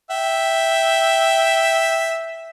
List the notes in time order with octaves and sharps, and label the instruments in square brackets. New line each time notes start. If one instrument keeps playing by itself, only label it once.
[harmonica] E5 G5